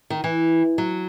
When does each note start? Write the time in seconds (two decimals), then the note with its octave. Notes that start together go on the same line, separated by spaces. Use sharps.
0.10 D#3
0.24 E3
0.78 F#3